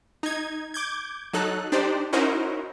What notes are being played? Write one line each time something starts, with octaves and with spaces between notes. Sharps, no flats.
D#4 G#6
D6 G6 G#6
F#3 D#4 A4 F#6
D4 D#4 G4 C5 D5
C#4 D#4 E4 F#4 A#4 C5